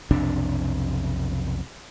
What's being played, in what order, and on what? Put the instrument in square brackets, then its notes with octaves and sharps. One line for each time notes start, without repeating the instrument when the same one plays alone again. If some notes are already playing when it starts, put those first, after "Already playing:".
[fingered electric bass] B1 F2 C3 D4